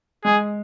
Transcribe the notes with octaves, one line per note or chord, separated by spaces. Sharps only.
G#3 G#4